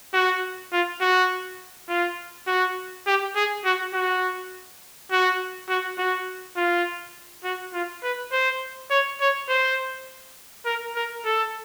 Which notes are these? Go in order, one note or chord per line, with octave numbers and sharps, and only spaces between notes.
F#4
F4
F#4
F4
F#4
G4
G#4
F#4
F#4
F#4
F#4
F#4
F4
F#4
F4
B4
C5
C#5
C#5
C5
A#4
A#4
A4